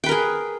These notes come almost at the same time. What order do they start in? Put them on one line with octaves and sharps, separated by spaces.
G5 B4 A#4 G#4